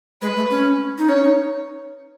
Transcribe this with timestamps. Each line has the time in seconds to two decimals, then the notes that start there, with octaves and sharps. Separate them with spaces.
0.22 G#3 B4
0.36 A3
0.50 C#4
0.98 D#4
1.09 C#4 C#5
1.23 D#4